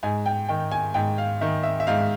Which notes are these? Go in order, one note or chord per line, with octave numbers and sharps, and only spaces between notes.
G#2 G#5
G5
D#3 G5
G#5
G#2 G5
F5
D#3 E5
E5
E5
G#2 F5